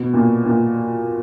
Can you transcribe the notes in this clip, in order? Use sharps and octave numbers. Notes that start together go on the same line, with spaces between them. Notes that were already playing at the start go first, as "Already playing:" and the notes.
Already playing: B2
A#2
A#2